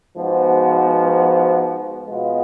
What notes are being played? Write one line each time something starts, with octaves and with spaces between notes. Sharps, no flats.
G#2 F3 B3 F#4
B2 G#3 B3 F4